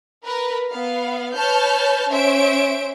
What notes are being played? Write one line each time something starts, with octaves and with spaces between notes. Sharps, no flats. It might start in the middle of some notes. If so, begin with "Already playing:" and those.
A#4 B4
B3 F5
B4 C#5 A5 F6 G6
C#4 C5 E5 D7